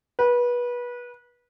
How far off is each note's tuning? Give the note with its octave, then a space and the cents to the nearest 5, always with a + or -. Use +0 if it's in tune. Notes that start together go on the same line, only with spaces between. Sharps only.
B4 -25